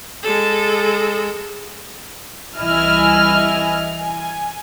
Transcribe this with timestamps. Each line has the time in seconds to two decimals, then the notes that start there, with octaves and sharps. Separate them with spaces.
0.23 G#3 A4
2.56 C2 E3 E4 D#5 G#5 F6
4.00 G#5